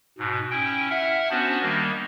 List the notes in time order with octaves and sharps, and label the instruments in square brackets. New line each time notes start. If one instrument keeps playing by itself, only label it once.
[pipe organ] G#2 B2
C#4 E4 G5
E5 F#5 F6
B3 C#4 D4 F#4 C5
D#3 G3 A#3 D#5